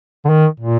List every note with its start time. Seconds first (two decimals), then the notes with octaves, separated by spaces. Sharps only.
0.25 D3
0.29 D#3
0.60 A#2